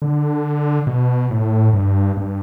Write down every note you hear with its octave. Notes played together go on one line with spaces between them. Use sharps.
D3
B2
A2
G2
G2